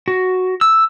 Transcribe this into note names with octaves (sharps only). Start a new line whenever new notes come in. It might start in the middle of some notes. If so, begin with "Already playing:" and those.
F#4
E6